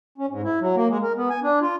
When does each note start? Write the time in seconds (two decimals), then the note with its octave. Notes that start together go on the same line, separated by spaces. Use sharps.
0.18 C#4
0.30 G#2
0.44 E4
0.61 F#3
0.76 A#3
0.89 G#3
1.03 A#4
1.16 B3
1.30 G#5
1.43 D4
1.62 F4